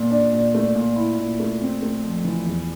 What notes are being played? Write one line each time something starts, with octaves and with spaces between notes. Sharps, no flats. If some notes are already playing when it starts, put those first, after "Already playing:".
Already playing: A#2
D4
A#2
A3
A#2
E4
A#2
A3
C4
A3
F2
E3
E2